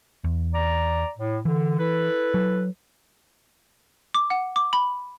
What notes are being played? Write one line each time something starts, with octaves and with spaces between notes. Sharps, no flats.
E2
D5 A#5
A2
D3 E3
E4 A4 B4
F#3
D6
F#5
D6
B5